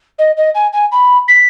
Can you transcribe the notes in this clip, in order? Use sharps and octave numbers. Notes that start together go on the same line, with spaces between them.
D#5
D#5
G#5
G#5
B5
B6